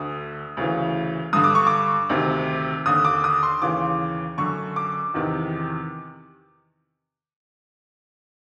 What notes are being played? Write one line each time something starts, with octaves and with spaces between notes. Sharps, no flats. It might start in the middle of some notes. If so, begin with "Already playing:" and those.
Already playing: D2 D3 D#6
D2 C#3 E3
G2 D3 D#6
D6
C#6
D6
D2 C3 D#3
D#2 D3 D#6
D6
D#6
C6
D#2 C#3 E3 D6
F#2 D3 C#6
D6
E2 C3 D#3